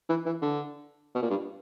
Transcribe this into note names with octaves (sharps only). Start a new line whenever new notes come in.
E3
E3
D3
B2
A#2
G2